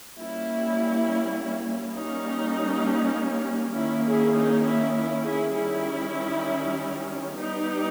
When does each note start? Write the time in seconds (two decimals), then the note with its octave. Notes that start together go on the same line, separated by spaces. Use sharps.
0.19 G3 A#3 C#4 E4
1.99 G3 A#3 C#4 D#4
3.77 D#3 A#3 C#4 E4
4.06 E4 G#4
4.36 D#4
4.67 E4
4.96 E4
5.26 E4 G#4
5.56 D#3 G3 C#4 E4
7.35 G3 B3 D#4 G4